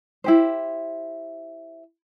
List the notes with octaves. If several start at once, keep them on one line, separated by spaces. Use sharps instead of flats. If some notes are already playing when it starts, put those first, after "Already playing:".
E4 G4 C5